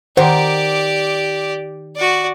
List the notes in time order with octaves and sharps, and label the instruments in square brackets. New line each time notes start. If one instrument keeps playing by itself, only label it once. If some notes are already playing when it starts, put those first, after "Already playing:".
[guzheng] D#3 [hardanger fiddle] G4 D5 [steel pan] C5 F#5
[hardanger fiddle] F#4 D5